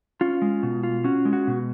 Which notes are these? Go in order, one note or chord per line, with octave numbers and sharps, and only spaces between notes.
C#4 F4
G#3
B2
F4
C#4 F#4
G#3
F#4
B2